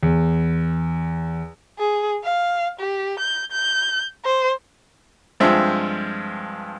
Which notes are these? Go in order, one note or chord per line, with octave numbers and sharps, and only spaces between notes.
E2
G#4
F5
G4
G6
G6
C5
G2 F3 G#3 C4 E5